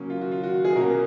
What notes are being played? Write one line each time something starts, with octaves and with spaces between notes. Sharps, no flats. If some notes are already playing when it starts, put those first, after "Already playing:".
Already playing: C#3 F#3 A#3 C#4
F4
F#4
F4
F#4
F#4
G#4
B2 A#3 C#4 A#4